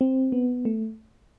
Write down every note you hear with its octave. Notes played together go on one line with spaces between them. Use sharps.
C4
B3
A3